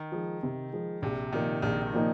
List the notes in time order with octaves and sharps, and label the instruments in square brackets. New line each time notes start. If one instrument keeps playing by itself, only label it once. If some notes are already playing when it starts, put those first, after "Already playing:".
Already playing: [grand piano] D#3
[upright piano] F3 G#3
C3
F3 G#3
[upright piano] A#1 [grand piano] C3
[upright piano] A#2 F3 A#3 D#4 [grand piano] D#3
[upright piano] A#1 [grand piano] D#3
[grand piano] D#3
[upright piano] A#2 F3 A#3 D#4